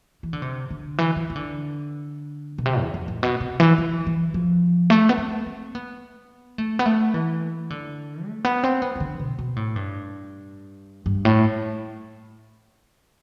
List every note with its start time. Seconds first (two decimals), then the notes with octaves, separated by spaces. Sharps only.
0.23 E3
0.33 D3
0.42 C3
0.71 D3
0.98 E3
1.16 E3
1.30 E3
1.36 D3
2.58 B2
2.66 C3
2.80 E2
2.94 F2
3.08 A2
3.23 B2
3.41 C3
3.60 E3
3.78 E3
4.06 E3
4.34 F3
4.90 A3
5.09 B3
5.18 C4
5.46 C4
5.75 B3
6.58 A3
6.79 B3
6.86 A3
7.14 E3
7.70 D3
8.26 A3
8.45 B3
8.64 C4
8.82 B3
8.96 E3
9.00 D3
9.19 B2
9.39 B2
9.56 A2
9.76 G2
11.06 G2
11.25 A2